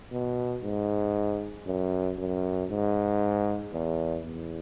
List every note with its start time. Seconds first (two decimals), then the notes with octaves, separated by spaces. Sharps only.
0.12 B2
0.63 G#2
1.66 F#2
2.18 F#2
2.71 G#2
3.73 E2
4.25 E2